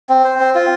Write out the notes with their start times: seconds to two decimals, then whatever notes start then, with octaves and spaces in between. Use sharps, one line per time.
0.09 C4
0.24 C5
0.40 C4
0.55 F4